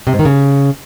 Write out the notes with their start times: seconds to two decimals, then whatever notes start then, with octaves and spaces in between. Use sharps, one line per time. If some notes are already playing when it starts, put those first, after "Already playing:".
0.07 C3
0.13 G#2
0.19 D#3
0.25 C#3